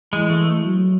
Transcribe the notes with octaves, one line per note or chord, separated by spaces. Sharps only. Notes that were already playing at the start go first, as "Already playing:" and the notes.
E3 G#3
A3
F#3